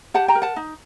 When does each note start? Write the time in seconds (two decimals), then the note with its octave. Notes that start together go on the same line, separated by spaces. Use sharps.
0.14 G4 F#5 A5
0.28 G5 A#5
0.35 A#4
0.42 F#5 A5
0.56 D#4